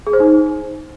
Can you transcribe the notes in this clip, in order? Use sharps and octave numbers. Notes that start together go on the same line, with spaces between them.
G#4
C5
D#4